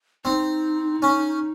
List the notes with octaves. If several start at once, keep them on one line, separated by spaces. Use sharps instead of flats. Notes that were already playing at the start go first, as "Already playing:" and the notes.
C4 D#4
C#4